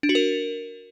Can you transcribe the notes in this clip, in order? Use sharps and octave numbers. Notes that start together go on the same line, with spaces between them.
D4
F#4
A#4